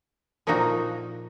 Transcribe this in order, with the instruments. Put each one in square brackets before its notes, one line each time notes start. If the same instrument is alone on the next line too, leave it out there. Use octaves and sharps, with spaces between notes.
[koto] A#2 F3 A#3 D#4 F#4